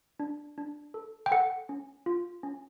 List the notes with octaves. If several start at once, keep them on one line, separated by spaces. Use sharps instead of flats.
D4
D4
A4
G5
A4 F#5
C#4
F4
C#4